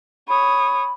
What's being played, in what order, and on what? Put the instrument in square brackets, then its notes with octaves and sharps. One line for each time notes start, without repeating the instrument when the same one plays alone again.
[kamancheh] C#5 D#6 [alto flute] B5